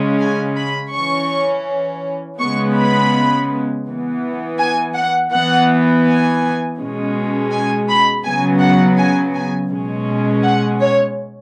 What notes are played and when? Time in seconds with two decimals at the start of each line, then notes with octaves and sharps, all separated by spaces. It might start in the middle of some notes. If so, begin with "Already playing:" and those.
Already playing: C#3 G#3 C#4
0.20 G#5
0.57 B5
0.93 E3 C#4 C#6
2.39 C#3 G#3 B3 C#6
2.76 B5
3.86 E3 B3
4.59 G#5
4.95 F#5
5.31 E3 B3 F#5
6.05 G#5
6.77 B2 G#3 C#4
7.51 G#5
7.88 B5
8.24 C#3 F#3 B3 G#5
8.60 F#5
8.97 G#5
9.33 G#5
9.70 B2 G#3 C#4
10.44 F#5
10.81 C#5